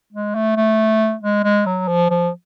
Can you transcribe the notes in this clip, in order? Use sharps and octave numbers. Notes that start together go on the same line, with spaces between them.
G#3
A3
A3
G#3
G#3
F#3
F3
F3